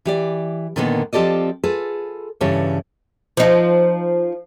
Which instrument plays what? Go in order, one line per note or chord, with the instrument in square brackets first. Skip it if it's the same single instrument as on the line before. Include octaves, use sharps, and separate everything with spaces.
[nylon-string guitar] E3 G4 D5
A#2 D3 D#3 A#3 B3
F3 C4 G4 A4 D5 D#5
F4 G#4 A4 B4
G2 C#3 E3 G3 A4 C#5
[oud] F3 D#4